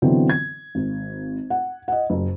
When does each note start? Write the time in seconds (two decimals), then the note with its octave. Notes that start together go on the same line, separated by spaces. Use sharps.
0.02 B2 D3 E3 F#3 C4
0.30 G#6
0.75 G#1
1.50 F#5
1.88 D#5 F#5
2.10 F#1